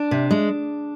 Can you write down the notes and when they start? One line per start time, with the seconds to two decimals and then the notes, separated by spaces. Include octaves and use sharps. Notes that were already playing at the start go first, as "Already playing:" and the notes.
Already playing: D4
0.11 C3
0.31 G#3